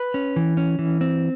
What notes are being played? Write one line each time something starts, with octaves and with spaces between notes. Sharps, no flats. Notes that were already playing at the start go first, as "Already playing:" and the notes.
Already playing: B4
C#4
E3
C#4
E3
C4